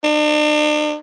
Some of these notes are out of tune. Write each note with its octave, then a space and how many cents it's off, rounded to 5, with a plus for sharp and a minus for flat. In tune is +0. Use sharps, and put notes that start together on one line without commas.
D4 +45